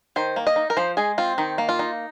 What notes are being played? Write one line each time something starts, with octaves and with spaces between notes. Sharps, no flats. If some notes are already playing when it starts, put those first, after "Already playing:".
D#3 C5
A#3
D#5
D#4
A#4
F3 C5
G#3 G#4
C4 F4
D#3 D#4
A#3
F4
D#4